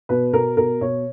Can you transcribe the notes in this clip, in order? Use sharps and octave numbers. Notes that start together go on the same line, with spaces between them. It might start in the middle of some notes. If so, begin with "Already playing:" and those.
B2 B4
B2 A#4
B2 A#4
B2 C#5